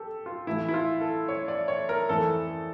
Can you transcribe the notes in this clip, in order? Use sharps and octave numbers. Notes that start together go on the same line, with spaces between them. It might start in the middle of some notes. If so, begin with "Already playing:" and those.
Already playing: G4 A4
F4
A2 E3 A3 E4
E4
F4
A4
C#5
D5
C#5
A#4
F2 E3 A3 A4